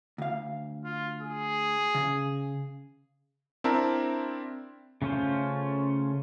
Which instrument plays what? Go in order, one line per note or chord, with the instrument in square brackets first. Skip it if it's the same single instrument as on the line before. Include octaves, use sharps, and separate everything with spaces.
[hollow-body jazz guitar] D2 F5
[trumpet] F4
G#4
[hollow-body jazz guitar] C#3
[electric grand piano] C4 D4 E4 A#4 E5 A5
[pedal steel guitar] C#3 A3 C#4 F4 C5